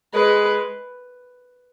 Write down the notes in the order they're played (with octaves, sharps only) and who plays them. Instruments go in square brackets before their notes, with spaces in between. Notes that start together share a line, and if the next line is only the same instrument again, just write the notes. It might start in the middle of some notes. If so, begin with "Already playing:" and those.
[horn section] G#3 [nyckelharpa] B4